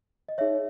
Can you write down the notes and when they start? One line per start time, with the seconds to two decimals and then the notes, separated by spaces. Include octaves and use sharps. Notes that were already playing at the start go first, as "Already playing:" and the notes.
0.29 D#5
0.38 D#4 G#4 C#5 E5